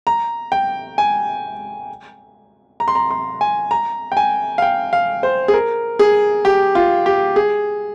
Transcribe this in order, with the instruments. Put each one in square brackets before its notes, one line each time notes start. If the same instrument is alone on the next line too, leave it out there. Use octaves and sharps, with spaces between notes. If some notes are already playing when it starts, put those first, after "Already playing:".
[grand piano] A#5
G5
G#5
A#5
C6
A#5
C6
G#5
A#5
G5
G#5
F5
G5
F5
C5
G#4
A#4
G#4
G4
F4
G4
G#4